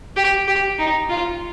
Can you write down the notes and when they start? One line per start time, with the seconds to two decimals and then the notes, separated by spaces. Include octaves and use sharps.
0.17 G4
0.48 G4
0.79 D#4
1.10 F4